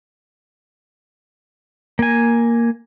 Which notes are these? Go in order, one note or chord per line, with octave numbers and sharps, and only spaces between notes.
A#3 G#5